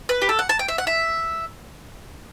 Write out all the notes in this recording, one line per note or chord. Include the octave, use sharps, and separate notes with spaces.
B4
G4
A4
F#5
A5
G5
E5
F#5
E5